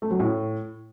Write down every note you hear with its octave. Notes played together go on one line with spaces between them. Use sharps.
A3
F#3
A2